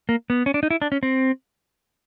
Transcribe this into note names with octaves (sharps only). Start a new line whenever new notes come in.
A#3
B3
C#4
D4
D#4
E4
D4
C#4
C4